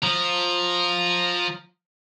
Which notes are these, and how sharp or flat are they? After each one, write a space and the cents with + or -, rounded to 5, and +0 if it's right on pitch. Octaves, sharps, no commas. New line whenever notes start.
F3 +15 A#5 +0